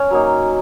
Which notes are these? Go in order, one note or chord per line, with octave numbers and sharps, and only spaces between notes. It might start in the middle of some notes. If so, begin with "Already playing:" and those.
Already playing: C#4 C#5
F#3 A#3 D#4